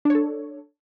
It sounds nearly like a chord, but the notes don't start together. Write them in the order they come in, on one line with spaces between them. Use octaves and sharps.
D4 C#5 A4